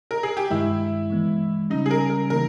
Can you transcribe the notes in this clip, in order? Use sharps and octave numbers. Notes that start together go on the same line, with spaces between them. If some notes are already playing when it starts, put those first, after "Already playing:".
A#4
G#4
G4
G2 D#3 G#3 E4
E3 G#3 B3
C#3 G3 C#4 D#4
G#4
A#4
A#4
C#3 E3 A#3 D#4 A#4